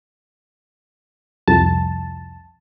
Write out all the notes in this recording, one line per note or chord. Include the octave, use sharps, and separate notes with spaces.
C2 F2 A5